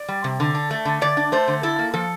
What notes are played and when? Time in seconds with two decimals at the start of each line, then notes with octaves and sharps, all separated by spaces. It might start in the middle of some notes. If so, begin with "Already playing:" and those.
Already playing: D5
0.08 G3
0.24 C3
0.40 D3
0.55 D4
0.71 A3
0.85 D3
1.01 D3 D5
1.17 D4
1.32 A3 C5
1.48 D3
1.63 E4 A4
1.79 A#3
1.94 F3 A4